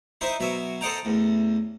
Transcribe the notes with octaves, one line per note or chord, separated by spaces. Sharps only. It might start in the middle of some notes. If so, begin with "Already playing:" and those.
D#4 E4 C5 D#5 E5
B2 F#3 E5
A4 C5 D#5 F#5 G5 A#5
A1 E2